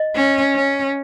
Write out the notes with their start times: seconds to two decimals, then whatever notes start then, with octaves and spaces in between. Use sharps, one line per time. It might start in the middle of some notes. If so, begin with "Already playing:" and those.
Already playing: D#5
0.15 C#4
0.55 C#4